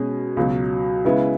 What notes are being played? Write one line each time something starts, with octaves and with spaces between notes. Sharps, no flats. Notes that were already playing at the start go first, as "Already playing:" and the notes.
Already playing: B2 G#3 C#4 G#4
C#2 B2 F#3
C#3 G#3 B3 E4